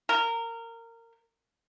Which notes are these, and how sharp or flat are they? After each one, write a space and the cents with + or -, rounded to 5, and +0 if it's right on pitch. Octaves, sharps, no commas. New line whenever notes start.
A#4 -20